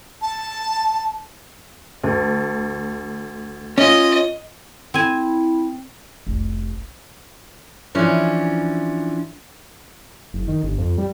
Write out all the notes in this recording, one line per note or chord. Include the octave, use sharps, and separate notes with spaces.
A5
D2
C#4 F4 D#5
C4 E4 G#5
F1 C2
E3 F3 C#4 D4
F#1
D#3
G1
F2
G3